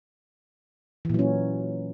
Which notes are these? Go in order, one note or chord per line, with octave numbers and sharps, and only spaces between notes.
A#2 E3 F#3 C#4